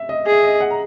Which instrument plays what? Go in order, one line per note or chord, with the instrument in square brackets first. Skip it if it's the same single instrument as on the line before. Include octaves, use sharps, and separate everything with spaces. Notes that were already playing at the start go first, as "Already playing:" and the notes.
Already playing: [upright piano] E5
D#5
[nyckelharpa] G#4
[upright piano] E5
D#5
F#5
A#5